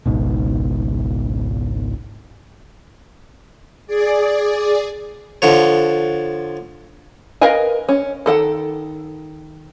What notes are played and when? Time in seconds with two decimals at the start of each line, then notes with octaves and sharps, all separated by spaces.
0.06 G#1 C#2 G#2 B2
3.87 G#4 D5
5.42 D3 F3 C#5
7.41 A#4 B4 D#5 F5 G#5
7.89 C#4
8.26 D#3 A4 F#5